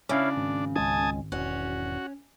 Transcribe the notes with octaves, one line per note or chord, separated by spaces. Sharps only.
C#3 C#4 D4 E4 F5
G#1
C#2 G#3 C#4 G#5 A5 D#6
E1 C#4 F#4